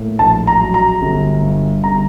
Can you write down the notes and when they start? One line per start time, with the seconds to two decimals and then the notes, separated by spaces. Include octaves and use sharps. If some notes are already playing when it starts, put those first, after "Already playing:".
Already playing: A2 A#3
0.19 A#1 A5
0.47 A#5
0.60 F#3
0.74 A#5
1.02 G1
1.42 G2
1.83 G1 A#5